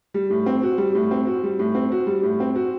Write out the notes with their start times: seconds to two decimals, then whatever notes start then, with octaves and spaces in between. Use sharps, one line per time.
0.14 G3
0.30 A2
0.46 C4
0.63 F#4
0.78 G3
0.95 A2
1.11 C4
1.27 F#4
1.44 G3
1.59 A2
1.75 C4
1.92 F#4
2.07 G3
2.23 A2
2.40 C4
2.56 F#4